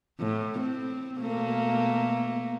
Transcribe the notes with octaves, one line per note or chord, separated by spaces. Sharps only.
A2
C4
B2 A3 A#3